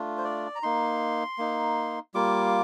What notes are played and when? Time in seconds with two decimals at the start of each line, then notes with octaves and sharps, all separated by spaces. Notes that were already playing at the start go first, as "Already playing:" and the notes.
Already playing: A3 D4 F4
0.18 C5
0.24 D5
0.55 A#5
0.63 A#3 D#4 C6
1.38 A#3 D#4
2.14 G3 A#3 F4 D6